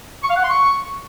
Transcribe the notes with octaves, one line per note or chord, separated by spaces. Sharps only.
C#6
F5
F#5
C6
C#6